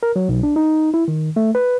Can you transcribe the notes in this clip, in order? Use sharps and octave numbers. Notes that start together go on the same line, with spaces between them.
A#4
F#3
B1
D4
D#4
E4
D#3
A3
B4